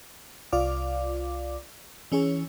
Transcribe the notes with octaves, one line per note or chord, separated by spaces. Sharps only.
C2 F4 D5 F5 D6
E3 C#4 G#4 C#5